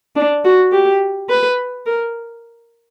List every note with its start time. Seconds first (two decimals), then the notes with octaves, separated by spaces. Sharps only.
0.16 D4
0.45 F#4
0.72 G4
1.29 B4
1.86 A#4